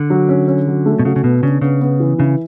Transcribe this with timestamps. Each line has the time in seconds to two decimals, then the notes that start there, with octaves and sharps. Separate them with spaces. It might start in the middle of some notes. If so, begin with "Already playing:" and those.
Already playing: D3
0.10 F#3
0.29 C#4
0.48 C#4
0.68 F#3
0.86 A3
0.99 B2
1.05 C#3 F#4
1.16 C#3
1.24 B2 B3
1.42 C#3 D4
1.61 C#3 B3
1.81 B3
2.00 E3
2.18 C#3 E4